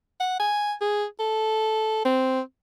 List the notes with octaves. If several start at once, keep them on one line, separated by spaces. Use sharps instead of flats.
F#5
G#5
G#4
A4
C4